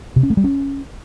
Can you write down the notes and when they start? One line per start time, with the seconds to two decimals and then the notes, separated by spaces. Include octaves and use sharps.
0.16 C3
0.23 C#4
0.30 A3
0.37 G3
0.44 C#4